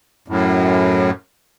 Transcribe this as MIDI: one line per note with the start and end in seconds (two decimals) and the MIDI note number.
0.28 1.11 42
0.28 1.11 45